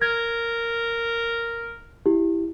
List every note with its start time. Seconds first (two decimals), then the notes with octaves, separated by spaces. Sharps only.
0.02 A#4 G#6
2.06 E4 G4